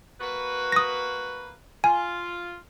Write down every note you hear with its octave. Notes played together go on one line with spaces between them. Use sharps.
A#3 F#4 B4
D#6 A#6
F4 G#5